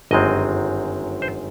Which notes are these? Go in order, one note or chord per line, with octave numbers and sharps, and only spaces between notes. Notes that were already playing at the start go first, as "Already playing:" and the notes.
G1 F#2 D#3 G#3 C4 D#5
C5